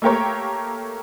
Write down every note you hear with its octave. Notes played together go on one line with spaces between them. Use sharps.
A3 A#3 G4 A#4 C#5